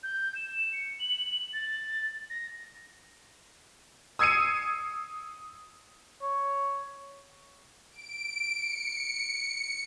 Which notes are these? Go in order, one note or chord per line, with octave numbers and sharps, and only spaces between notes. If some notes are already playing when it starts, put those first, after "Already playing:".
G6
E7
C#7
F#7
A6
A#6
D#6 E6 G#6 C7 C#7 D#7
C#5
D7
C#7